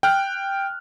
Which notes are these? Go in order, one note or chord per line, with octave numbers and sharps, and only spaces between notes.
G5 F6 F#6